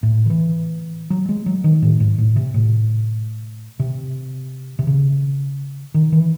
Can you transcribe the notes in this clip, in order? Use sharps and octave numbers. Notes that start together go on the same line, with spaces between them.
A2
D#3
E3
F#3
G#3
F#3
D#3
A2
G#2
A2
C3
A2
C3
C3
C#3
D#3
E3